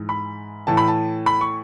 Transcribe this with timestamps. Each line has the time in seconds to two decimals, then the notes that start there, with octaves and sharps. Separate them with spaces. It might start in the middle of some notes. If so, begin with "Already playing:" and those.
Already playing: G#2 E3
0.09 B5
0.67 A2 E3 A5
0.77 B5
0.88 A5
1.26 B5
1.41 C#6